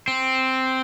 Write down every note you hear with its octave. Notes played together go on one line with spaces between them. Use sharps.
C4